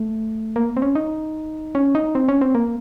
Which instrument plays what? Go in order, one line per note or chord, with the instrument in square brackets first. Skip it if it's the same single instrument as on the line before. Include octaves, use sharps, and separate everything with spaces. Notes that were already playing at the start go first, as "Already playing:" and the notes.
Already playing: [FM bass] A3
A#3
C4
C#4
D#4
C#4
D#4
C4
C#4
C4
A#3